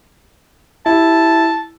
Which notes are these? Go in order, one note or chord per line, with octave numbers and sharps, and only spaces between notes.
E4 G4 A5